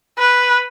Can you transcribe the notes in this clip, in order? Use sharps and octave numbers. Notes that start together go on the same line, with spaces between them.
B4